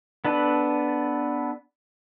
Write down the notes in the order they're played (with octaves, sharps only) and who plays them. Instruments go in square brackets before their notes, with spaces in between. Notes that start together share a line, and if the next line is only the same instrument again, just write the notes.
[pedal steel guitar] B3 D4 A4 B4